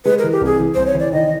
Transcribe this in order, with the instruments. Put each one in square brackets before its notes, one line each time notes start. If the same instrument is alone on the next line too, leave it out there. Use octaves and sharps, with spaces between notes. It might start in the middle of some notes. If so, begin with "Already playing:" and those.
[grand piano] G#3 [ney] B4
[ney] A#4
[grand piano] E3
[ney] G4
[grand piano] C2 [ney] G#4
[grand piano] E3
[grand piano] C2 [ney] C5
[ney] C#5
[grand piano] E3 [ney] D5
[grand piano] D#3 [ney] D#5